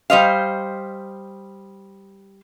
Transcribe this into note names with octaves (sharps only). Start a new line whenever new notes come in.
G3 C5 D#5 F5